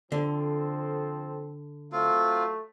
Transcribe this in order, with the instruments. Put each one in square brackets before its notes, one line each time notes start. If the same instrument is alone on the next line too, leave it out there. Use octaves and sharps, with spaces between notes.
[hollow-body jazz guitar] D3 [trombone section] F3 C4 A4
[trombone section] F#3 A3 [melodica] C4 F4